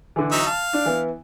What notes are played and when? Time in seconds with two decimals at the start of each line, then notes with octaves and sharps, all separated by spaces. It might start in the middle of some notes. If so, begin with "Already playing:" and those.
0.16 D3 E3
0.32 F#3 D#4 E5
0.46 F5 A5
0.73 D4 D5
0.86 E3 B3